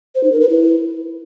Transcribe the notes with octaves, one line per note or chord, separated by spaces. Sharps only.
C5
D#4
A#4
B4
E4